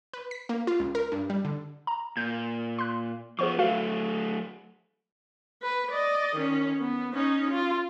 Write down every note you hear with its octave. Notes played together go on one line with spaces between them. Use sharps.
B4
B6
A#3
F4
C#2
A#4
G2
G3
D3
A#5
A#2 G6
C6 F#6
F3 B3 G#4 C5 C#6
F#3 A3 F#4 F5
B4
D5 D#5
D#3 C#4
B3
C#4 D#4
F4